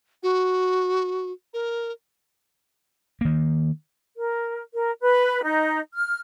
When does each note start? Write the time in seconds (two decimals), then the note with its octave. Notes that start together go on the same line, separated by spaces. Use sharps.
0.23 F#4
1.54 A#4
3.21 D#3 A#3
4.18 A#4
4.72 A#4
5.01 B4
5.44 D#4
5.93 F6